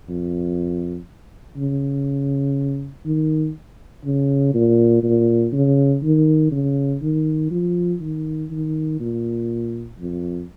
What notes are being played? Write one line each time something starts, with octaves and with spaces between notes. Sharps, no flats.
F2
C#3
D#3
C#3
A#2
A#2
C#3
D#3
C#3
D#3
F3
D#3
D#3
A#2
F2